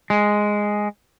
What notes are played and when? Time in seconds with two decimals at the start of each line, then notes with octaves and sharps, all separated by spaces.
0.10 G#3